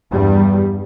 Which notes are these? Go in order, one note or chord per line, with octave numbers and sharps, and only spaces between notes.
E2 G2 G3